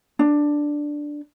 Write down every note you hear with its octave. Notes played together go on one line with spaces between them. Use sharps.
D4